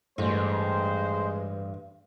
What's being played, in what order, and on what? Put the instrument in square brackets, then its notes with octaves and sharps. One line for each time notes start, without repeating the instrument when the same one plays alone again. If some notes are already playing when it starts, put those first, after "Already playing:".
[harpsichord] A1 [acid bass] G2 [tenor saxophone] G#3 [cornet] C5